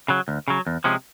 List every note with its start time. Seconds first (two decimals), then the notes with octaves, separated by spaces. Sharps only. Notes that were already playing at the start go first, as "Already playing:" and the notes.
0.08 C#3 F#3
0.28 D2
0.48 C#3 F#3
0.67 E2
0.84 C3 F3 G#3 C#4